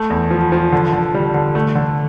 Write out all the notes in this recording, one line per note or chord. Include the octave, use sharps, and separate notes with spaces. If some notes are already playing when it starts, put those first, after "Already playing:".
Already playing: A3
E2
F3
F3
D3
D3
G3
D3
A3
D3